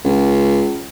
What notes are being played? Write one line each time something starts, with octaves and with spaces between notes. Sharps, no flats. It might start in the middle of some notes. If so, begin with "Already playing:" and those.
C#2